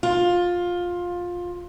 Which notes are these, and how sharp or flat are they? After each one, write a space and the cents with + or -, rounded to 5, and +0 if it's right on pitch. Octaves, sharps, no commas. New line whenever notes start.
F4 +15